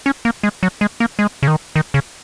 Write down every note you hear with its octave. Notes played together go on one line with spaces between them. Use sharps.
C#4
A#3
G#3
F#3
G#3
A#3
G#3
C#3
D#3
D#3
C#3